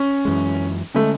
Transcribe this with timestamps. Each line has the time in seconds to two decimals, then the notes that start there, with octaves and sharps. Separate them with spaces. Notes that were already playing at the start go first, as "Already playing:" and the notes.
Already playing: C#4
0.25 F#2 E3 G#3
0.94 D3 G#3 A3 C#4